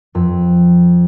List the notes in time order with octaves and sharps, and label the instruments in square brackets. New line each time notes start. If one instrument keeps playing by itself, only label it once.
[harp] F2